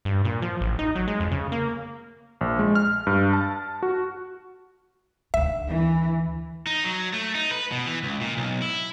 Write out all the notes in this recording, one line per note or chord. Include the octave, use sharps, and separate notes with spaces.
G2
A#2
F3
A1
D#4
F#3
G#3
F2
C#3
A#3
A#1
G#3
F6
G2
A5
F#4
D2 D#3 E5
E3
D#4
F#3
A3
D#4
B4
B2
E3
C#2
A#2
B1
E4